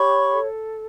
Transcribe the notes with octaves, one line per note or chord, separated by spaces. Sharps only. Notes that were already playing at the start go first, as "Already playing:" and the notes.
Already playing: G4 C#5 B5 C#6
A4